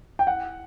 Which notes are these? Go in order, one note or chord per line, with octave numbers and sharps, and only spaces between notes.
G5
F#5